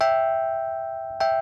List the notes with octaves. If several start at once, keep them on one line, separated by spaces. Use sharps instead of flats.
E5 G5
E5 G5